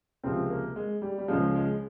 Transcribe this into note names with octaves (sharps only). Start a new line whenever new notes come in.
C#2 C3 F3 C4
A#3
G#3
G3
G3
C#2 C#3 F3 G#3
G#3